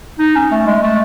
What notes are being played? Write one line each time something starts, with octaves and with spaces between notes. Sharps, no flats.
D#4
C#4
A3
G#3
A3